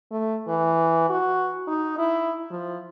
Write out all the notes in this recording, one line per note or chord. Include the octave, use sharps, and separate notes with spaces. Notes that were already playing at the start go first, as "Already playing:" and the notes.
A3
E3
F#4
D#4
E4
F3